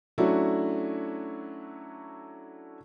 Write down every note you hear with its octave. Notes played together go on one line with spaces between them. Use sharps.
F#3 A3 C#4 D4 E4 F#4